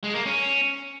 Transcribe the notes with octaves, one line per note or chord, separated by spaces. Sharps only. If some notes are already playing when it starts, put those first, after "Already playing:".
G#3
A#3
C#4